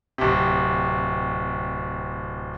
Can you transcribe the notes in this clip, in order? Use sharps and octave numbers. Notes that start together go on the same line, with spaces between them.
D1 C3